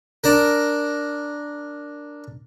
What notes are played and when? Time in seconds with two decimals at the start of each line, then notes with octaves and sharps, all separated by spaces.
0.24 D4 A#4